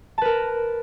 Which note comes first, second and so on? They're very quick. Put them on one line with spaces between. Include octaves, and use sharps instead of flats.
A5 B4 A#4